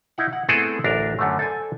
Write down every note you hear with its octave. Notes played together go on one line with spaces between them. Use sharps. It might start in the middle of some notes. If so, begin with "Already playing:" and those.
D#4 E4 F#5
F#5
A3 B3 C4 E4 G#4 A4
A1 D2 D4 A#4
F#2 D3 A3
A4 C5 D5 G#5 A5